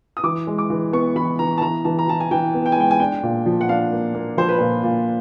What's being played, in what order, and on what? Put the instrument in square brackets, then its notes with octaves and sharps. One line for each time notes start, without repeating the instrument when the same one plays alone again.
[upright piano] D#6
[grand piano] E3 [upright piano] D6
[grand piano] G#3
[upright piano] D6
[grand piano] E3
[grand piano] B3 [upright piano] C#6
[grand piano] E3 [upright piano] B5
[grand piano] E3 [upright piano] A#5
[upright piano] A5
[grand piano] E3 [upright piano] A#5
[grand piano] E3 [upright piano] A5
[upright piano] A#5
[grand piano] E3 [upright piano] A5
[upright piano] G#5
[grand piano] E3 [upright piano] G5
[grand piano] B3
[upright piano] G5
G#5
[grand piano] G#3 [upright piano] G5
[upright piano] G#5
[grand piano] D4 [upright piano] G5
[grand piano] A#2
F3
[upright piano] F#5
[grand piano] D4 [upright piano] F5
[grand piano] A#3
A#3
[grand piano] F3 [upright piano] C5
[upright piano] B4
[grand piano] A#2 [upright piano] C5
[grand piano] A#2